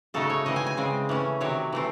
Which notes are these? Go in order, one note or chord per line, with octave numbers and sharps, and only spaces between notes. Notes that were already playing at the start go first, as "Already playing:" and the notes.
C#3 F#3 A3 D#4 A4
C#5
C#3 E3 C4 D#5
G#5
G#5
C#3 G#3 C4
E3 A3 C#4
C3 D#3 F#3 C#5
E3 A3 C4